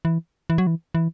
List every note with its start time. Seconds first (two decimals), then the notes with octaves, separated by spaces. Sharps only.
0.05 E3
0.50 E3
0.58 F#3
0.67 E3
0.95 E3